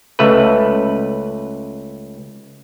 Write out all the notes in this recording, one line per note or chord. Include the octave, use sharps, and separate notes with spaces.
C#2 A3 B4